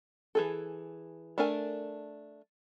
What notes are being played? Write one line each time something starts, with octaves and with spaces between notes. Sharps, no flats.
E3 G#4 A4
A3 D4 A#4 G#5